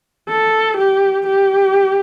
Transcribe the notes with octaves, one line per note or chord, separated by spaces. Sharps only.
A4
G4
G4